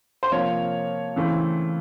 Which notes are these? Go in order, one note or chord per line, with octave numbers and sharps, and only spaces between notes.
C5
C3 F3 A#3 C#5
C#3 E3 A3 C4